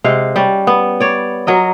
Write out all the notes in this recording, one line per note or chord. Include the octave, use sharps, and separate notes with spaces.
C3 G#3 F5 F#5
G3 C#4
B3
C#5 D5
F#3 A#4 D#5